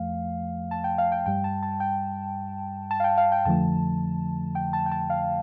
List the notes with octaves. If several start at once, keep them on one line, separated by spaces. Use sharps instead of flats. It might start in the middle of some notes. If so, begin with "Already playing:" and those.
Already playing: F2 F3 A3 F5
A5
G5
F5
G5
G2 G3 G5
A5
A5
G5
A5
F5
G5
F5
G5
F2 D3 F3 A3 A5
G5
A5
G5
A5
F5